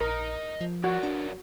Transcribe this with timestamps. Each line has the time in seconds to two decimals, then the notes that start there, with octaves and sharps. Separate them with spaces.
0.01 A#1 A#4 D#5 A#5
0.61 F3
0.84 F#3 F#4 A#4 D5
1.03 D4